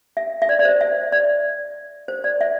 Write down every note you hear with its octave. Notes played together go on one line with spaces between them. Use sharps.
E5
E5
D5
D5
C5
E5
D5
C5
D5
E5